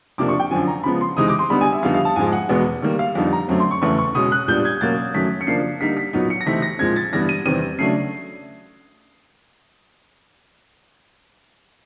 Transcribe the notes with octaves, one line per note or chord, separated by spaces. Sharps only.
F2 C3 F3 A#3 D4 D6
C#6
G5
F#2 D3 F3 G#5
A#5
C#3 F3 G#3 B3 B5
C6
C3 E3 G#3 C4 D#4 D#6
D6
C6
D3 G3 B3 D#4 B5
G#5
E5
F2 D3 G3 B3 D#4 F5
F5
A5
G#2 F3 G#3 G#5
F#5
E2 B2 G#3 B3
D#3 G3 A#3
F5
F2 D3 G3 B3 D#4
A#5
F#2 D3 F#3 A3 C4
C6
C#6
E2 C#3 E3 A3 C#6
C#6
B2 G#3 C#4 D#6
F#6
A#2 G3 B3 D4 G6
G#6
B2 F#3 A#3 C#4 A6
F#2 D#3 F#3 A3 C#4 B6
C#7
C#3 F3 A#3 D4 C7
D3 G3 A#3 D#4 B6
B6
A#2 F#3 B3 D#4
C#7
A#6
C3 E3 A3 C4 D#4 B6
A#6
A#2 F3 G#3 C4 G#6
A6
G2 E3 G3 B3 A#6
D#7
E2 C3 D#3 G3 C4 D#7
C#3 F#3 A3 D4 C7